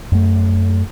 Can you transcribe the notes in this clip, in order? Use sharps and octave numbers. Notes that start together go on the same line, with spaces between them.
F#2 A3